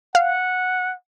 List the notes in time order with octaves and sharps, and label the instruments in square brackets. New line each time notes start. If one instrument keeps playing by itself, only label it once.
[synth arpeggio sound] F5 [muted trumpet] F#5